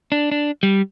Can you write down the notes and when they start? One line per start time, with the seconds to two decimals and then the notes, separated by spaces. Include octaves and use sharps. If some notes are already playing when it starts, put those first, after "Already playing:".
0.12 D4
0.31 D4
0.63 G3